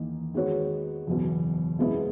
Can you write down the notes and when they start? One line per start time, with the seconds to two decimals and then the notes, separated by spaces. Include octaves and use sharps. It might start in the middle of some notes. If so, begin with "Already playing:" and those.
Already playing: E2 D#3 A#3 D#4
0.34 D#3 G#3 B3 F#4 C#5
1.07 F#1 E2 B2
1.79 B2 G#3 B3 E4